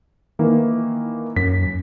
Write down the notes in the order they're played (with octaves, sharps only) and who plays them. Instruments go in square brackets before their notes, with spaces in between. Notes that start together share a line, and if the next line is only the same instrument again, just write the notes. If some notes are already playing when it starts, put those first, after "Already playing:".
[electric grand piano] D#3 E3 A#3
[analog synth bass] F#2 [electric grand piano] B6